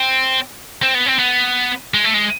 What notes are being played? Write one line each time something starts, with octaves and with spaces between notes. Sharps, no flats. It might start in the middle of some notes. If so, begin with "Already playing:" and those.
Already playing: C4
C4
B3
C4
B3
G#3
A3
G#3